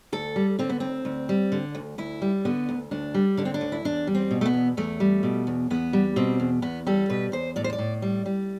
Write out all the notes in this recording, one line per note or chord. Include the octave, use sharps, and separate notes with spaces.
D2 A4
G3
D3 C4
B3
D2 C4
D2
G3
D3
D2
D2 E4
G3
D3 B3
D2
D2 D4
G3
D3 D4
C4
D4
D2
E4
E2 D4
G3
C4
B2
A3
B3
E2
E2 A3
G3
B2
E2
E2 B3
G3
B2 C4
E2
E2 B3
G3 A4
B2 B4
E2 C5
A2 D5
C5
D5
A2
G3
G3